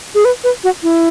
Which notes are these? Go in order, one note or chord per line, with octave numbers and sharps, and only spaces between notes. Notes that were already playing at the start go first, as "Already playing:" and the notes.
G#4
B4
B4
F#4
E4